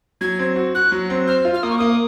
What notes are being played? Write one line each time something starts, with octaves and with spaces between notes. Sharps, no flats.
F#3 G#6
C4
F#4
F#4 F#6
F#3
C4
C5 F6
F4
F6
A#3 D#6
C#6
A#3 D#6